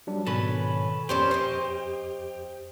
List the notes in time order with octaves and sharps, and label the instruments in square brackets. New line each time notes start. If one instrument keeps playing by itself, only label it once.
[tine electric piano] F#3 G3 D4
[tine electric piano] G#2 B2 D#3 [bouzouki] C#4 [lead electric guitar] A4 B4
[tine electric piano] F2 [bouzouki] A#2 C#4 C5 [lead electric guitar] G4
[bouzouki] C5 D#5